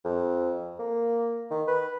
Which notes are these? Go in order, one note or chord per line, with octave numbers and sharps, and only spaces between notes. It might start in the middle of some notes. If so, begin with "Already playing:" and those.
F2
A#3
D#3
B4